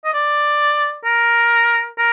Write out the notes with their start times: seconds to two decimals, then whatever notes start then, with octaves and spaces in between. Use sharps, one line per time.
0.05 D#5
0.13 D5
1.05 A#4
1.98 A#4